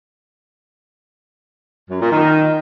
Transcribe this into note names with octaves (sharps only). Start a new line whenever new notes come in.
F#2
A#2
D#3